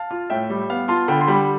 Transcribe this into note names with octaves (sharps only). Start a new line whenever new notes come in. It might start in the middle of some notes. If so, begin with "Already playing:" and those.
Already playing: F5 A5
F4
A2 E5 G5
G3
B3 F5
F4 A5 C6
D3 G5 B5
C6
G3 G5 B5